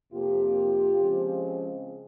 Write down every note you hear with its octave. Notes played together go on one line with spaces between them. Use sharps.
F2 C3 F3 A#3 F4 G4
C#3 F3 G#3 C4